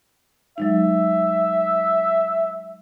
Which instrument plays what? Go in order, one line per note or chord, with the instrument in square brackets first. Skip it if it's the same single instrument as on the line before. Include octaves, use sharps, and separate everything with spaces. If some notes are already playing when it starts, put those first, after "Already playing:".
[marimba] F#3 G#3 D#4 [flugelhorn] E5